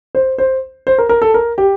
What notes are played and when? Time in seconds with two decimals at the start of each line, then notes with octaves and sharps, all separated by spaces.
0.15 C5
0.38 C5
0.87 C5
0.98 A#4
1.09 A#4
1.22 A4
1.34 A#4
1.58 G4